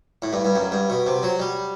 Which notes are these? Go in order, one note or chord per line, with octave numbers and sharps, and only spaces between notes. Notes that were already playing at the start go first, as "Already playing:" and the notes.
A2
G2
G2
F#2
G2
B2
C3
F#3
G3